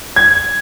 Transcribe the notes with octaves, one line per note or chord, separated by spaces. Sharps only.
G#6